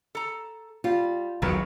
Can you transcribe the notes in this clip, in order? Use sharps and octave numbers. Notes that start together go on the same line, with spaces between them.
A4 A#5
G3 F4
E1 B1 B2 D#3 F#3 B3